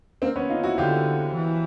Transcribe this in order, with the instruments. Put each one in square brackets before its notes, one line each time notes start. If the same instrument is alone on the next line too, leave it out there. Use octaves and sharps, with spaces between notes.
[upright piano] A#3 C4
B3 C#4
D#4 F4
E4 F#4
[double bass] D3 [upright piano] F4 G4
[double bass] E3